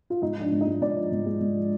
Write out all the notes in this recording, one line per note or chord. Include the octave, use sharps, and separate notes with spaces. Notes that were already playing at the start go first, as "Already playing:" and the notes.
F4
G#2 D#4
F3 D4
G#2
D#4
G#3
G#2 D5
F3
G#2
G#3
G#2
F3